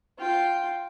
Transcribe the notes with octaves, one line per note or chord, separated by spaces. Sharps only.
F4 G5